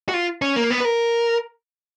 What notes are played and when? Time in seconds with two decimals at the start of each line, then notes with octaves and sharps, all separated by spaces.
0.09 F#4
0.14 F4
0.42 C#4
0.56 A#3
0.70 B3
0.80 B4
0.85 A#4